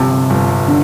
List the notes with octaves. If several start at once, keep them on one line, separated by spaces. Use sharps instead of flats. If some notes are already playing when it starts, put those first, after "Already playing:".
Already playing: G1 F2 C3 A5
G1
D3